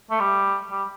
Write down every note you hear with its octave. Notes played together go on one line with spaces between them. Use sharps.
A3
G3
G3